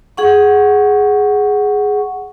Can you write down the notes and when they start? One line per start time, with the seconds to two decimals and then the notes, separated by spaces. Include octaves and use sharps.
0.17 G#4 F#5 C#6